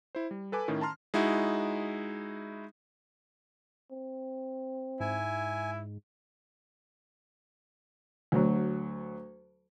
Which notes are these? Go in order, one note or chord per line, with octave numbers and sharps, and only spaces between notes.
E4 C5
G3
A4 B4 G#5 D6
A2 D#3 C#4
A5 A#5 C6 F6
G#3 D#4 E4 F#4
C4
G#2 E4 G#5
D2 F#3